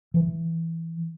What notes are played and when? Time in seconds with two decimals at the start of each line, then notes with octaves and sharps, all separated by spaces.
0.14 E3